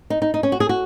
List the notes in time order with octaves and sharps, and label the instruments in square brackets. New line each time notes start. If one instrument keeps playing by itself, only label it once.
[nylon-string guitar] D#4
D#4
D#4
C#4
F#4
G#4
F#4